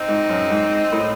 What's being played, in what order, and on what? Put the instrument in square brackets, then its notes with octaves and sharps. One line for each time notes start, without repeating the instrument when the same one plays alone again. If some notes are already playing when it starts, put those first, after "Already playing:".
Already playing: [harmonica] C4 D#4
[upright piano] G#2
F#2
G#2
A2